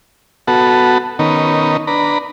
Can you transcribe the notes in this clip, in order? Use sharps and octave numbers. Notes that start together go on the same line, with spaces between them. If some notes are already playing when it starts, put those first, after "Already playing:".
B3 F#4 A4
D#3 B3 C#4 D#4 A#4
D4 B4 A#5